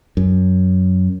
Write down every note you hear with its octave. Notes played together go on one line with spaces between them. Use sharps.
F#2